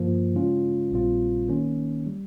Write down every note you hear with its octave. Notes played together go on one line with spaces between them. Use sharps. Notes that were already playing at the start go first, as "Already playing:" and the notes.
Already playing: G2 F3 A#3
C#3 G#3 C#4 F4
A#1 A#2 G3 C4 F4
D#3 A#3 C#4
G3